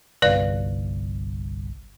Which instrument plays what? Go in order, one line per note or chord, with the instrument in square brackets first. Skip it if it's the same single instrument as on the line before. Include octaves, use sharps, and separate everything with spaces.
[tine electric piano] G1 C2 [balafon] B4 D5 F5